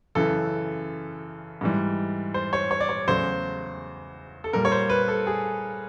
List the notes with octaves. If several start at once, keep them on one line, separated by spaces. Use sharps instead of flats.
F#2 C#3 E3 A4
G#2 E3 G3
C5
C#5
C#5
D5
C#5
E2 C#3 F#3 A3 C5
A4
A#2 G3 A#4
C#5
C5
B4
A4
G#4